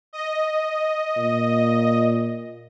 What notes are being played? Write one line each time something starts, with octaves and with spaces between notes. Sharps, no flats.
D#5
A#2